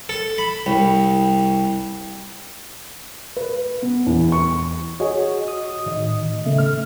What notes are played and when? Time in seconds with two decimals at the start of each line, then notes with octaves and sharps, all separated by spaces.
0.09 A4
0.38 B5
0.66 C2
3.37 B4
3.82 B3
4.06 E2
4.32 C#6
5.00 F#4 G#4 C#5 D#5
5.48 D#6
5.86 A2 D#3 D#5
6.46 C#3 A3 E5
6.58 F6